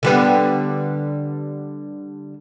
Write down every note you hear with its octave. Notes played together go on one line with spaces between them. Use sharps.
D3 G3 B3